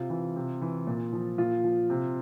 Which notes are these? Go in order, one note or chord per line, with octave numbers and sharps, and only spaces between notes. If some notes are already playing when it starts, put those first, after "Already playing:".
Already playing: C3 F4
E3
C3
E3
A#2
F3
A#2 F4
F3
C3